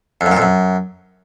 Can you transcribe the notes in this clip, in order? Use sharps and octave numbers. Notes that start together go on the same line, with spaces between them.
F2
F#2
A#2
F2
F#2